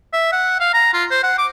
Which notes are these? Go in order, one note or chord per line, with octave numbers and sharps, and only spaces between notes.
E5
F#5
F5
A#5
F4
C5
F#5
D6